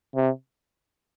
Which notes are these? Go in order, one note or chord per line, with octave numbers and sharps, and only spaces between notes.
C3